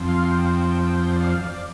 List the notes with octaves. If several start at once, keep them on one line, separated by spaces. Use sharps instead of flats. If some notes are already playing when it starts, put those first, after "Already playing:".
Already playing: F2 F3 C4
F5
G5
D5
F5
D5